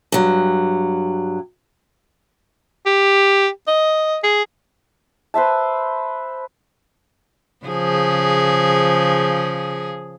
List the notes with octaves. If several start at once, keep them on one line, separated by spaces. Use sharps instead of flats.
G2 F#3
G4
D#5
G#4
B4 C5 E5 A5
C#3 F3 G#4